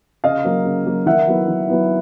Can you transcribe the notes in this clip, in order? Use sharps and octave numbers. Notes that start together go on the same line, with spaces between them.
C#3 D#5 F5
F#3 A#3
C#3
F#3 A#3
D#3 E5 F#5
F#3 B3 E4
D#3
F#3 B3 E4